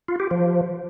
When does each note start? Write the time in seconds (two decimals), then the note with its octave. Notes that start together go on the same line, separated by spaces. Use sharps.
0.08 F4
0.20 G4
0.31 F3